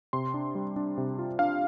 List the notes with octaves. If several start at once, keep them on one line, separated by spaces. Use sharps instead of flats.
C3 C6
D4
G3
D4
C3
F4
D4 F5